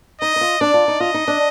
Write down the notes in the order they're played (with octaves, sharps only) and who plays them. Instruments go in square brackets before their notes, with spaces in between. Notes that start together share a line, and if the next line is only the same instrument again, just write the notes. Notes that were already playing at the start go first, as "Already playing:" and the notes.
[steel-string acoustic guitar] D#4 [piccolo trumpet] D#5
[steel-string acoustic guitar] D#4
F4
[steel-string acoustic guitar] D4 [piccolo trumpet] D5
[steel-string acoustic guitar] F4
D#4
[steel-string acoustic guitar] F4 [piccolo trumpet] D#5
[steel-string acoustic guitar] D#4
D4